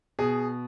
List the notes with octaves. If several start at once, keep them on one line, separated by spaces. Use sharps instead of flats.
B2 G#4